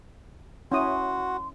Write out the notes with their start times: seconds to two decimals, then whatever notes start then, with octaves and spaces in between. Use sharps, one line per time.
0.72 C#4 E4 F#4 C6 D#6